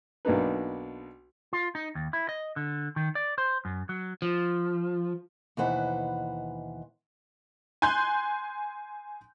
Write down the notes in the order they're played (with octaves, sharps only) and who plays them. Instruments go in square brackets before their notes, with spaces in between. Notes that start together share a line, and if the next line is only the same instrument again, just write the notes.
[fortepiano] B1 A#3 D4 D#4 B4
[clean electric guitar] F4
D#4
D#2
E4
D#5
D3
D#3
D5
C5
F#2
F#3
[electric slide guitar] F3
[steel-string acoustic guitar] D#2 B2 E3 B4 C5 F#5
[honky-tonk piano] G#5 C6 F#6 G6